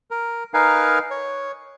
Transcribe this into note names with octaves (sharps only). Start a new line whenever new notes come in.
A#4
D#4 A#4 B4 F5 G#5
C#5